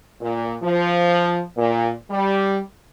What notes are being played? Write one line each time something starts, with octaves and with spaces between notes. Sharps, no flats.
A#2
F3
A#2
G3